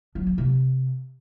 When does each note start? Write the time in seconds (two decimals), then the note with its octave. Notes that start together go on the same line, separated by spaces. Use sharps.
0.15 F#3
0.27 A#3
0.38 C3